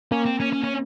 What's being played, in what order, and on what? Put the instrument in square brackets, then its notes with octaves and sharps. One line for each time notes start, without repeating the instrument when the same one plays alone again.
[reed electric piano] A#3 [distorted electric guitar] C#4
[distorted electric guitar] C4
C#4
C#4
C#4